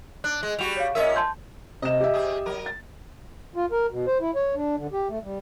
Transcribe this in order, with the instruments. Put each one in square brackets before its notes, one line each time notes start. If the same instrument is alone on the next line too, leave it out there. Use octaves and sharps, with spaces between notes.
[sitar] D4 [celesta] F#6
[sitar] G#3
[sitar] G3 F#4 [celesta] F7
[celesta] C#5 F5
[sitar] A#2 C#4 E5 [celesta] A#4 D#5
[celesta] A5 C6 G6
[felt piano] C3 E7 [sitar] D#5
[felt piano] G4 E5
[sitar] C3 G#4
F#3 A#4
[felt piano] A6
[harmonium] F4
A#4
B2
C5
E4
C#5
D4
D3
G4
A3
G3